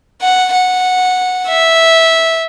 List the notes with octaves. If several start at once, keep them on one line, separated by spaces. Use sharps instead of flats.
F#5
F#5
E5